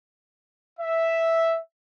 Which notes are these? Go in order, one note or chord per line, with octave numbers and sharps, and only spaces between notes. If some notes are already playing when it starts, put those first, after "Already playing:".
E5